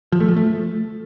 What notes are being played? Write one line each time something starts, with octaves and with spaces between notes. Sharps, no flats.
F3
A3
F3
A3